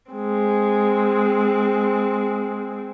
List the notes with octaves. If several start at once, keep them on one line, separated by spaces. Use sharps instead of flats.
G#3 C4